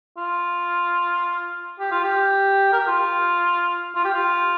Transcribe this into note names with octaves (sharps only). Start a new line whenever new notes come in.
F4
G4
F4
G4
A#4
G4
F4
F4
G4
F4